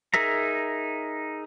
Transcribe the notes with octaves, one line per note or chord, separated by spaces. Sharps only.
D#4 G#4 A#4 E5 A#5